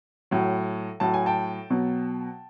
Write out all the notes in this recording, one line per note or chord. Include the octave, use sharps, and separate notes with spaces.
A2 F#3
A2 F#3 A5
G#5
G5 A5
B2 F#3